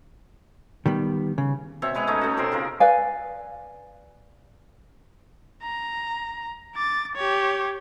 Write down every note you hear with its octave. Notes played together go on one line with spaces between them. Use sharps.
D#3 G3 B3
C#3
B2 C4 C#5 E5
G#3 B4 C#5 G#5
A3 B3 C#4 D#4
A3 F#4
B2 C4 A#4 C6
C#3 F4 A#4
B4 D5 F5 G#5
A#5
D6 A6
G4 C#5